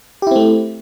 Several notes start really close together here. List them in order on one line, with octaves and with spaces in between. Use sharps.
G4 E4 C4 A3